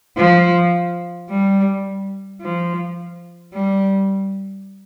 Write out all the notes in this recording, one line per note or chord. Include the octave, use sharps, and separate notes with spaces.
F3
G3
F3
G3